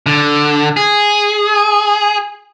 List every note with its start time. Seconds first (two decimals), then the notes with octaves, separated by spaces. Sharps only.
0.06 D3
0.77 G#4